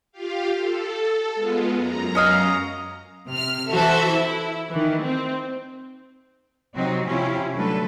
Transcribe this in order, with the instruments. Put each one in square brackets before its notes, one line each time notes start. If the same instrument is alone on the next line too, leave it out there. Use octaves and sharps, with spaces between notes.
[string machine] F4 G4 F5
A4
G#3 B3 F4
F#2 A#5
[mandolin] C#4 D#5 F5
[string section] C3 F6
E3 F#4 A4 C5 E5
E4
D#3 E3
C4
[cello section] C3 F#3 C4 D#4 F#4
C3 F3 C#4 E4 F4 G4
D3 F#3 G3 A3 A4 B4